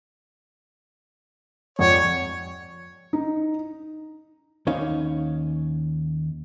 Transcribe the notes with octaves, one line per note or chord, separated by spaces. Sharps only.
F2 C#5 D5 F#5
D#4
D#2 C#4 D#4 C#5 F5